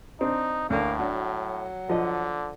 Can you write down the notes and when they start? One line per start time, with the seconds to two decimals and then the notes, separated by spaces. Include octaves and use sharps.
0.21 C4 D4 D#4
0.70 D2 A2 A#3
0.99 F#3 D4 F#4
1.90 D3 F3 D#5